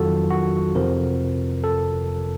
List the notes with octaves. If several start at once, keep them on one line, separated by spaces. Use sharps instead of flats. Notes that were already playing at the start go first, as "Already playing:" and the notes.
Already playing: F2 D#3 F#3 F4 F#4 A4
F#4
F2 C3 F3 A#4
A4